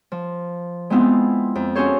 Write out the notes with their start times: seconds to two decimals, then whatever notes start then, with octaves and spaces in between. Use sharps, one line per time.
0.12 F3
0.90 G#3 B3 C4 E4 F4
1.55 F2
1.75 C#4 F#4 G#4 A4 C5 C#5